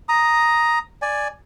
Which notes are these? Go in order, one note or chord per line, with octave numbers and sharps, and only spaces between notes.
A#5 D#6
D5 G#5